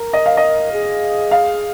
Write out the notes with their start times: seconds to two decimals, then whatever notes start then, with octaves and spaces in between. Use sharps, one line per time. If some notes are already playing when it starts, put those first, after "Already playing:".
Already playing: A#4
0.13 D#5
0.26 F5
0.37 D#5
0.72 G#4
1.31 F5